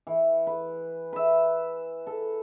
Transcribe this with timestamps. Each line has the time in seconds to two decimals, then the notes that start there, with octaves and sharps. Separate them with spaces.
0.07 E3
0.47 B4
1.13 B4 E5
2.07 A4